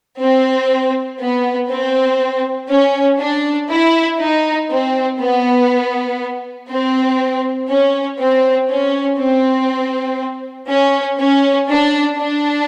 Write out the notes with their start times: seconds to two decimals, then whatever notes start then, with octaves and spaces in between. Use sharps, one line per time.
0.20 C4
1.20 B3
1.70 C4
2.70 C#4
3.20 D4
3.70 E4
4.20 D#4
4.70 C4
5.19 B3
6.69 C4
7.69 C#4
8.19 C4
8.70 C#4
9.19 C4
10.69 C#4
11.19 C#4
11.69 D4
12.19 D4